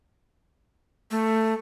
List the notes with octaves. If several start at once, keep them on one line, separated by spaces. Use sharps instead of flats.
A3